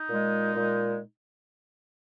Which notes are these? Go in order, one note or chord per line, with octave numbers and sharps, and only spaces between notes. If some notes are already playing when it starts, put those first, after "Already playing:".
Already playing: D#4
A#2 G#3
A#2 G#3